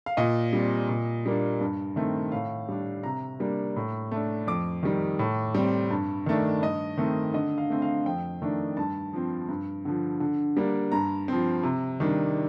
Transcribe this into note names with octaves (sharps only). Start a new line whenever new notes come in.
F5
A#2 D#5
G3 C4
A#2
G3 A#3 D4
G2
D#3 A3 C4
A2 F5
G3 D4
C3 A#5
G3 A#3 D4
A2
A3 D4
F2 D6
D#3 G3
A2
G3 C4
G2
D#3 A3 D4
G2 D#5
D#3 A3 C4
D3 D#5
F5
A3 C4
F5
F2 G5
D#3 A3 D4
G2 A5
F3 C4
G2
D3 F3
D3
G3 A#3 D4
G2 A#5
F3 C4
C3
D#3 G3 D4